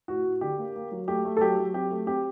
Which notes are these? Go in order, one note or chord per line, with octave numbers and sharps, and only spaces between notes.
A2 F#4
A2
D3 G4
A#3
A#3
F#3
A3 G4
A3
A4
F#3 G4
F#3
C4 G4
A3
C4 G4